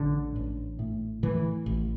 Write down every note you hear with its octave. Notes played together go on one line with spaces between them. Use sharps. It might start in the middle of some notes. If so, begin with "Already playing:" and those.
Already playing: A1 A2 D3
A1
A2
A2 E3
A1